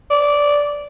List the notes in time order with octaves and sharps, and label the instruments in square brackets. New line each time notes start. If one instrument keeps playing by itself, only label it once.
[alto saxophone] D5